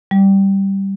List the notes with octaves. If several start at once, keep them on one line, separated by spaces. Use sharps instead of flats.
G3